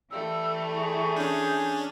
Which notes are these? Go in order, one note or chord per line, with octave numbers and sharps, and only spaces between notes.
E3 G3 A3 E6
G#4 C#6
C#4 D4 G6